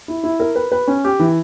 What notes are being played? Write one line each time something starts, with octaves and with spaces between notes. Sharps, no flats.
E4
E4
A#4
B4
B4
C#4
G4
E3